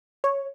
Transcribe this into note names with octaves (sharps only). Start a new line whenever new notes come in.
C#5